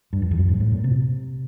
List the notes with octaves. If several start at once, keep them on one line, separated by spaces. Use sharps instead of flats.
G2
F2
E2
F#2
G#2
A2
A#2
C3